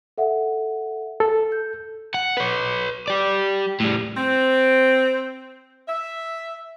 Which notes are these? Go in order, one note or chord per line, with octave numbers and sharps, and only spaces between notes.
A4 E5 F#5
A4
G6
F#5
B4 C#5
G4 D5
A2 G3
C4
E5